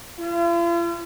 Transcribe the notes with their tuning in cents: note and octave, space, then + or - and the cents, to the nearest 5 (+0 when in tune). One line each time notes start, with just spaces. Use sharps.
F4 -45